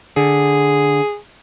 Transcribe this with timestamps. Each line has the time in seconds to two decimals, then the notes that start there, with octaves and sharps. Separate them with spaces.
0.17 D3 G#4